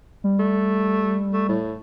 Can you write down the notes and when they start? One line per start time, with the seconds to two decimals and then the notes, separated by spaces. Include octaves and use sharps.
0.24 G3
0.39 A3
1.33 A3
1.49 A2